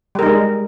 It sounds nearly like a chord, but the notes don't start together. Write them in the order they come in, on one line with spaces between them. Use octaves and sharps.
G3 A#4 D#4 G#3